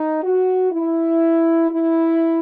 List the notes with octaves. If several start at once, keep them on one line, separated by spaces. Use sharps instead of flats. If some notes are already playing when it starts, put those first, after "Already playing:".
Already playing: D#4
F#4
E4
E4